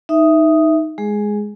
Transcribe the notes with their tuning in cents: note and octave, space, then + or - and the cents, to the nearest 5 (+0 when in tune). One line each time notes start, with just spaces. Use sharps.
D#4 +5 E5 +0 D#6 +0
G#3 +0 G#4 +0